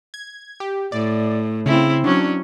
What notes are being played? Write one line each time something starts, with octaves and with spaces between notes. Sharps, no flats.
G#6
G4
A2 D5
C#3 C4 E4
F#3 C#4 D4